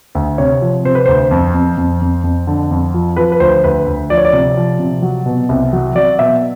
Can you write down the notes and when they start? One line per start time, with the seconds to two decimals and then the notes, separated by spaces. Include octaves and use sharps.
0.15 D2
0.38 C3 C#5
0.62 F3
0.85 C3 C5
0.95 B4
1.06 D2 C5
1.31 F2
1.54 F2
1.77 F2
2.02 F2
2.24 F2
2.47 D3
2.71 F2
2.94 F3
3.17 F3 B4
3.32 B4
3.40 D2 C5
3.64 D2 B4
3.86 D2
4.10 F3 D5
4.18 C#5
4.25 D5
4.33 C3
4.57 F3
4.79 C3
5.02 F#3
5.26 B2
5.49 C2
5.73 F#3
5.95 F#3 D5
6.19 B2 E5